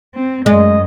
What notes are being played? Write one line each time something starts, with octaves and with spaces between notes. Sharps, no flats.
C4
F#2 G#3 D#5